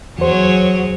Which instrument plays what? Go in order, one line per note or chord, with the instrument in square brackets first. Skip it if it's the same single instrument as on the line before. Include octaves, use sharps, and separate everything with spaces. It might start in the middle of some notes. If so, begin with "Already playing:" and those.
[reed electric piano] E2 C5 [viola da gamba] F#3 G#4 C#5